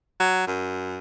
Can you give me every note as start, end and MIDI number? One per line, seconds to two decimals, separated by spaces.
0.20 0.46 54
0.47 0.99 42